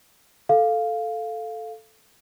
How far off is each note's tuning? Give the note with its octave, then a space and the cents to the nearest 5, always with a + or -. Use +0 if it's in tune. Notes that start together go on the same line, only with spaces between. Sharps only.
A4 +0 F5 +0